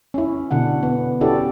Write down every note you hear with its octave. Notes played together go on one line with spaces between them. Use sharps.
C#4 E4
B2 D3 D4 F#5
B3
C#4 E4 F#4 G4 A4 D5